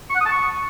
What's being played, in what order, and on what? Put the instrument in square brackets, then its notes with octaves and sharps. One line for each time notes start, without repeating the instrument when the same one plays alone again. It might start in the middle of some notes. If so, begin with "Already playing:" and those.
[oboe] C#6
F#5
D#6
A5
C#6